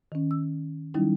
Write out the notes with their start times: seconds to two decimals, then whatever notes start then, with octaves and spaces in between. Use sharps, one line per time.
0.12 D#3 C#4
0.31 E6
0.94 D#3 F#3 G3 C#4 D#4 E4